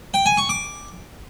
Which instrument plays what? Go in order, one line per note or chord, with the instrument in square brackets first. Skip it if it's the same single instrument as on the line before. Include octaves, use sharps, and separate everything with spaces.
[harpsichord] G5
G#5
C#6
D6